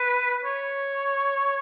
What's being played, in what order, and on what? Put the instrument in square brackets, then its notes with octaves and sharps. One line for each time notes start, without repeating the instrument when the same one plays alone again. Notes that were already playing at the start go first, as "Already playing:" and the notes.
Already playing: [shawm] B4
C#5